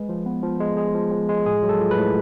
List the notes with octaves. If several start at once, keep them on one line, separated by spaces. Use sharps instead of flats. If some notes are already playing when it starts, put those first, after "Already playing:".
Already playing: G#3 B4
F3
B3
F3
G#3
G#3 G#4
F3
F3
G#3
A2 G#4
F#3
A4
F4
B4
A2